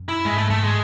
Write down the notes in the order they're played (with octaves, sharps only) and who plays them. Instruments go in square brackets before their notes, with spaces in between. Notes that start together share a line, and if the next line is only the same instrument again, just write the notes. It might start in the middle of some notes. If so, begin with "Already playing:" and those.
Already playing: [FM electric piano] F#2
[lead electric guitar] E4
[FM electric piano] G#2 [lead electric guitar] G#3
[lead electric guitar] A3
[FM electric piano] G#2 [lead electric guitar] A3
[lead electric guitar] G#3